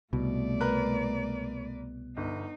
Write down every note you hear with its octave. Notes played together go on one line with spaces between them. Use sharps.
C2 B2 A3 D5
A#4 B4 F#6
G1 D#4